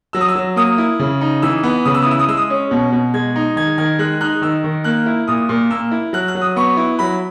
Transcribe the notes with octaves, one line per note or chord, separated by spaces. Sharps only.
F#3 E6
D#6
E6
F#3
A#3 D#6
E4
C#3
D#4
E3 E6
B3
C#3 D#6
E6
D#6
E4 E6
D#6
G#3 E6
D#6
C#4
B2
B2
G#3 G#6
D#4
D#3 G#6
D#3 G#6
G#3 F#6
D#4 F#6
D#3 E6
D#3
A#3 F#6
E4
A#2 D#6
A#2
A#3 E6
E4
F#3 F#6
F#6
F#3
D#6
B3 C#6
E4
F#3 B5